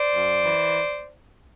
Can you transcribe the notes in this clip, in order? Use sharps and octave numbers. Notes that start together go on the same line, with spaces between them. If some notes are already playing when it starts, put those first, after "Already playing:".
Already playing: C5 D5
F#2
E3